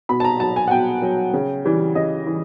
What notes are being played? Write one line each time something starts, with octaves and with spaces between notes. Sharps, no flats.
B2 B5
A5
A#5
F#3 A5
G#5
F#5
B2 G5
F#3
C#3
E3 G3
C#3 D#5
E3